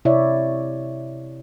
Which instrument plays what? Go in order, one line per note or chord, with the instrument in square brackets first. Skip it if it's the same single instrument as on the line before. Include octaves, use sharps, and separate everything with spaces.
[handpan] C3 E4 C#5 D5 E5